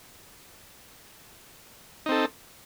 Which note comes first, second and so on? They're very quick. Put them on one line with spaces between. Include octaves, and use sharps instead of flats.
D#4 C4 A4